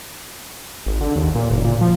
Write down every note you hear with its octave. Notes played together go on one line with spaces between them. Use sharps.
G#1
D3
D#2
A#2
F#1
A#2
F3